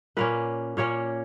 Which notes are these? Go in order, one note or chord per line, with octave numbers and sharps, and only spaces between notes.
A#2 A#3 C#4 B4
A#2 A#3 C#4 C#5